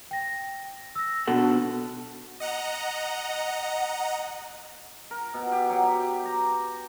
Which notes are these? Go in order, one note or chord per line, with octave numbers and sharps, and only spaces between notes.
G5 A#6
E6 A#6
B2 D4 F#4 A4 F#5
D#5 F#5 A#5
A#4
B2
G4
F#3
G4
A#5